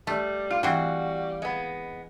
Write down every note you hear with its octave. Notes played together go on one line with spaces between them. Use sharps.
G3 A3
F4 F5
E3 G3 C4 F#4
G#3 B3